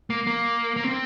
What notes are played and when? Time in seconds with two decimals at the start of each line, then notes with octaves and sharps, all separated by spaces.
0.10 A#3
0.27 A#3
0.76 A#3
0.84 C4